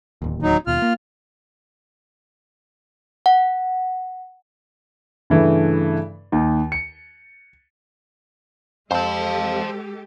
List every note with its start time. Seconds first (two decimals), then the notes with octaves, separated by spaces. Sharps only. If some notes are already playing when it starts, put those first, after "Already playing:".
0.22 D1 D#2
0.42 F#3 D#4
0.67 D#2 B2 F4 F6
0.82 A#3
3.26 F#5
5.30 G2 C#3 E3 A3
6.32 D#2 D#4
6.72 C#7
8.91 F2 G#3 C4 G4 A4 C5 A5